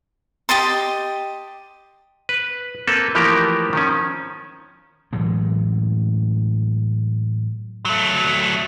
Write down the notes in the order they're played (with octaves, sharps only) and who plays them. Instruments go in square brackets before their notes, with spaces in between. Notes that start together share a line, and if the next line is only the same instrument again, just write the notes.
[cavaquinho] G4 D#5 A5 C6
[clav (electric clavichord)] B4
A#3 C4 A4 B4
E3 F3 A3 A#3 G4 A#4
D#3 F3 C#4
[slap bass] A2 E3 F#3 G#3
[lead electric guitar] F#3 A3